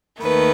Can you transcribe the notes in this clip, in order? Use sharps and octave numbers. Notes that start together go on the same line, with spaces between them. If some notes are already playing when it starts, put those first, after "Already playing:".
D#2 D#3 A3 B4